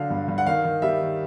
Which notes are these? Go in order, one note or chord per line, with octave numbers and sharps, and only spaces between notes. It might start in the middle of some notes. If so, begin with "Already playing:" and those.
Already playing: D3 F#3 F5
G2
G2
F#5
D#3 F5
D#3
G3 E5
D#3